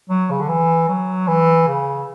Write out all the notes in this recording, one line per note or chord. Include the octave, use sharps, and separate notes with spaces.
F#3
C#3
D3
E3
F#3
E3
C#3